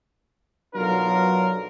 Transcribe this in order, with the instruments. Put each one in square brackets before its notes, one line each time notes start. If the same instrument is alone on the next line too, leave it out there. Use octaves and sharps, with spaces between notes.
[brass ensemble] B1 F#3 B3 D4 F4 A#4